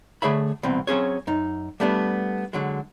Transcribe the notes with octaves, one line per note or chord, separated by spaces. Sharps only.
D3 A3 G#4 C#5 E5 B5
C2 B2 E3 C4
F#3 C4 C#4 G#4 C#5
F#2 D#4
G3 A3 B3 D4
D3 F#3 G#3